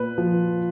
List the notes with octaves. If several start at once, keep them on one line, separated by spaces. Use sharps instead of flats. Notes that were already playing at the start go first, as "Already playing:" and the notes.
Already playing: A#2 B4
F3